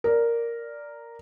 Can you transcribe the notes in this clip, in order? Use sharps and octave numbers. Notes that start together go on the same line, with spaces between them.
A#4 D5